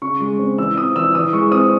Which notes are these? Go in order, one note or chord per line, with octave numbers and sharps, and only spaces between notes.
C#3 C#6
G#3
C4
E3 E6
C4 D#6
E3 E6
E3 D#6
G#3 C#6
C4 D#6